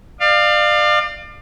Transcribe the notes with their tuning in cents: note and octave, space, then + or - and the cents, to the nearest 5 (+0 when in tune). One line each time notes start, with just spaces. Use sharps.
D5 +35 F5 +0